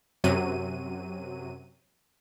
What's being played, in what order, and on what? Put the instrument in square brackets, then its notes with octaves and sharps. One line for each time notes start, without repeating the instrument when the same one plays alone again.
[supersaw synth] F#2 C3 F#3 D#7